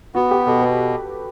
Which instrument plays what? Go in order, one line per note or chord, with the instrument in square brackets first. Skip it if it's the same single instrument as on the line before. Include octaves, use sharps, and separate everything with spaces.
[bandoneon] B3 [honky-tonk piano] F#4
[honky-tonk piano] G4
[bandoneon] B2 [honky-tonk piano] A4
[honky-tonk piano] B4